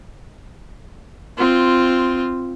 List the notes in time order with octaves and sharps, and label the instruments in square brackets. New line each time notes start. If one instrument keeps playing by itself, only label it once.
[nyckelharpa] C4 F4